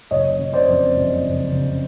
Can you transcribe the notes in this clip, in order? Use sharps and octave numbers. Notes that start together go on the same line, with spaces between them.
F#1 C#5 D#5
C#3
C5 D5
F2
F#1
F#1
C#3